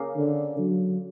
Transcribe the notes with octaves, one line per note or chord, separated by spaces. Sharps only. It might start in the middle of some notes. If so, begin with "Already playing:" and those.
Already playing: C#3 A#3
D3
F#3